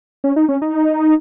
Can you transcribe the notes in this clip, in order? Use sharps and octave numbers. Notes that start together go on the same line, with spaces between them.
C#4
D#4
C#4
D#4